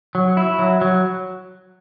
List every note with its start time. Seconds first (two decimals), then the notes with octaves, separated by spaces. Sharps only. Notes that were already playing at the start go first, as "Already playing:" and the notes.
0.15 F#3
0.37 E4
0.59 F#3
0.81 F#3